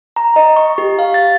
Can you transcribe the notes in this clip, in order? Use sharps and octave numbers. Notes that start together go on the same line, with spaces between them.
A#5
D#5
C#6
G4
F5
A6